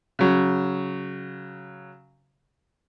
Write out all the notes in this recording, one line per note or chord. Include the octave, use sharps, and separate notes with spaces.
C#3 F#3